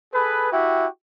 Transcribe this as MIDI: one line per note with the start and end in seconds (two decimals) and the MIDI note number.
0.14 0.53 68
0.14 0.53 69
0.14 0.53 71
0.53 0.87 64
0.53 0.87 66
0.53 0.87 67
0.53 0.87 76
0.53 0.87 79